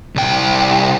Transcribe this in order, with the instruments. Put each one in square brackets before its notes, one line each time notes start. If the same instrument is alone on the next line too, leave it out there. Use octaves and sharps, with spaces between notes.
[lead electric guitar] C2 G5